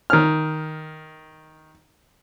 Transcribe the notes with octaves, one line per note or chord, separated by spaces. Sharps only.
D#3 F6